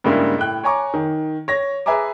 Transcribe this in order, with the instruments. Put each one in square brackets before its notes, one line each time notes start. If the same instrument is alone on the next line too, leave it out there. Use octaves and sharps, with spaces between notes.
[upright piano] G2 C#3 G3 G#3 A#3 E4
A2 G5 F#6
C#5 G#5 A#5 C#6 D6
D#3
C#5 A#6
G#4 B4 E5 G#5 A#5 D6